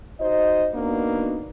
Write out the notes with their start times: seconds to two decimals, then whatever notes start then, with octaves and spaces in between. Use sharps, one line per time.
0.21 D#4 F#4 C5 D#5
0.74 A#3 B3 D4 D#4 F#4